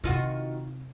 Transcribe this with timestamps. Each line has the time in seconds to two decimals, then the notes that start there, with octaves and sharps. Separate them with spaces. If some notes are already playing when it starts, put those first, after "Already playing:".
0.04 C3 D#3 F4 F#4